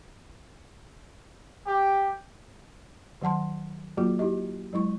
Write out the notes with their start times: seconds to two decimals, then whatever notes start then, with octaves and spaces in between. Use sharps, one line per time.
1.67 G4
3.21 D#3 F#3 F#5 A5 C6
3.98 F#3 A#3 F4 F#4 G#4
4.19 E4 F#4 G4 D#5
4.73 F#3 G#3 E4 C#6